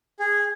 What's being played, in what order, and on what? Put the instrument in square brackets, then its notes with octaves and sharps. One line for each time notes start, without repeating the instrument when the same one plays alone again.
[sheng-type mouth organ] G#4